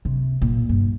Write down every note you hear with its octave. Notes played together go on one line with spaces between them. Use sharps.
C3
A#2
G2